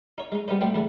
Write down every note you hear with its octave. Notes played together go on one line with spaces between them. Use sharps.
D#4 C#5
G#3 D#4
G3 B3 C#4 D#4 C5
B1 A2 A3 C4 G5
E2 D3 A3